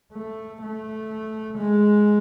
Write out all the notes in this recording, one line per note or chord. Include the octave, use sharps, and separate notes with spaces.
A3
A3
G#3